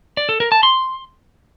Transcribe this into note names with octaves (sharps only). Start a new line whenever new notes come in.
D5
A4
A#4
A5
C6